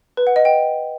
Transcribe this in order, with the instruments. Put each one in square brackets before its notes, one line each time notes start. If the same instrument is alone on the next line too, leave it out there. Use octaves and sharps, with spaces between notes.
[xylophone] B4
F#5
D#5
G5